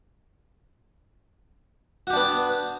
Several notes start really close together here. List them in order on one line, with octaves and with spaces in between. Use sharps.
F#4 G4 D4 B3